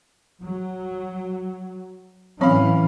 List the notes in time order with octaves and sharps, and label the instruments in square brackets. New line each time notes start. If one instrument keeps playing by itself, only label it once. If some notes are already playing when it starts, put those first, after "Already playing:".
[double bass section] F#3
[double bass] A2 C#4 [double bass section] E3 [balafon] F#3 C4 C#5 [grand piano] F5 B5